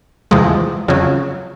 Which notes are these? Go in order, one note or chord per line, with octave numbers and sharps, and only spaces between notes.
E2 C3 F3 G#3
F2 C#3 F#3